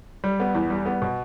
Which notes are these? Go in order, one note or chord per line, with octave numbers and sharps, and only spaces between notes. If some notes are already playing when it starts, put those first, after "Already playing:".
G3
B3
E2
G3
B3
B2